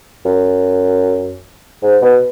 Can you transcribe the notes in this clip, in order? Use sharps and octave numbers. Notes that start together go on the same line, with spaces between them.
F#2
G#2
B2